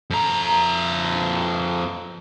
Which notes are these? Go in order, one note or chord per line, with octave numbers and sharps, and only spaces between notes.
F2 A#5